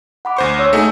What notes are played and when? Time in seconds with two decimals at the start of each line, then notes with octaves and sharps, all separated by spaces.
0.25 F#5 B5 D6
0.37 D2 C5 C#6
0.59 C#5 E6
0.73 A3 D#4 G#4